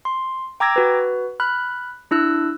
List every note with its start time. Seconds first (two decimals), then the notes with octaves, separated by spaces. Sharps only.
0.05 C6
0.60 G5 A#5 D6 E6 G#6 A#6
0.76 F#4 B4
1.40 B5 F6 F#6
2.11 D4 E4 E6 F#6